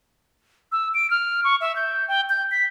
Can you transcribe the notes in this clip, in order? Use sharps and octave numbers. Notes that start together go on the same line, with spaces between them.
E6
D7
F6
C#6
E5
G6
G5
G6
B6